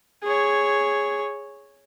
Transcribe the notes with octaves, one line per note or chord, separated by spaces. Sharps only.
G#4 C#5